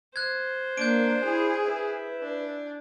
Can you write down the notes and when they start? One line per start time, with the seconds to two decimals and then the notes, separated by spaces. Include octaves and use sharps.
0.16 C5 F#6 G#6
0.78 A#3 D4 G6 D7
1.25 E4 G#4
1.66 E4 B4
2.23 D4